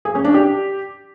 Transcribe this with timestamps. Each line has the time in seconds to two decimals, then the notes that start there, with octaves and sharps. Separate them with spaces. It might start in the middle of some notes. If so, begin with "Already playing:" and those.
0.05 G#4
0.15 C#4
0.25 D4
0.34 G4